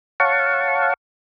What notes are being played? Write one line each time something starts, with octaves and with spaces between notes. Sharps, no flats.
C#5 F5 F#5 A5 C#6